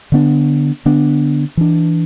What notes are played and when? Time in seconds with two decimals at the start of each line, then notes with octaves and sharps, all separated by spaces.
0.12 D3 B3 D4
0.86 D3 B3 D4
1.57 E3 D4